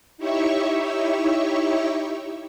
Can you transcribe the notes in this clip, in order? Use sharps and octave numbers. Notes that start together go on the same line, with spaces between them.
D#4 E4 G4 C#5 E5 C#6